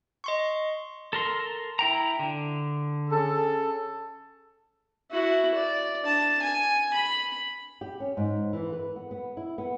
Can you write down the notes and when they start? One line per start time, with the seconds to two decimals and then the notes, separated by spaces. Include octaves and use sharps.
0.24 D#5 C6 C#6
1.13 A4 A#4 C6
1.79 E4 G5 A#5
2.19 D3
3.10 C#4 G#4 A4
5.11 E4 F#4
5.54 D5
6.02 D4 A5
6.42 G#5
6.93 B5
7.81 G4
8.00 C#4
8.17 G#2
8.53 E3
8.72 B4
8.96 B3
9.11 B3
9.37 E4
9.58 B3